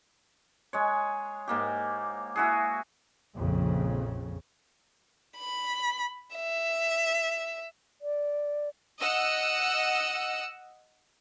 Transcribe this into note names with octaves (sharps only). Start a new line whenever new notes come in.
G#3 C#5
G#2 A#3 G4
E4 F#4 G#4
A#1 F2 C#3
B5
E5
D5
D#5 F#5 E6